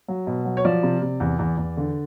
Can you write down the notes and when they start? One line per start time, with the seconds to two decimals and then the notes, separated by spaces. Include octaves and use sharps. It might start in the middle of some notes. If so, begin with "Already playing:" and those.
0.08 F#3
0.27 B2
0.45 F#3
0.57 C#5
0.65 F3 D5
0.83 C3
1.02 C3
1.20 E2
1.39 E2
1.57 E2
1.77 D3